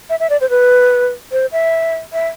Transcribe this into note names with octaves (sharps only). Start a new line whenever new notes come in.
E5
E5
D5
C5
B4
C5
E5
E5